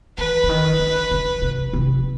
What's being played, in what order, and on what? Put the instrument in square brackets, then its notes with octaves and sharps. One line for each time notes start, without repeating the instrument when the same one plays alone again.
[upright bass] E3 [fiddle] B4
[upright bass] D3
D#3
D3
C#3
C3
C3